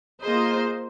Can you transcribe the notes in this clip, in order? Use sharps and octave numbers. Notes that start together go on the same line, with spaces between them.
A#3 F4 G#4 C5 D#5